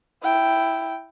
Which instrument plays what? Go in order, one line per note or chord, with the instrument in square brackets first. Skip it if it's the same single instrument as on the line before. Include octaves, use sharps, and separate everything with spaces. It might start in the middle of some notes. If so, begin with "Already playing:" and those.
[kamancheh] E4 G5